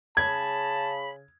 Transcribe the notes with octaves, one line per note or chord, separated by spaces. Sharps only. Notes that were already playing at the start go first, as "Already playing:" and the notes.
C#3 A5 B5 G#6